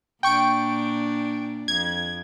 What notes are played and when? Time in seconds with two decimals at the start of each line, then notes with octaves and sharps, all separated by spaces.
0.23 A#2 D4 G5 C#6 D7
1.68 F2 G#6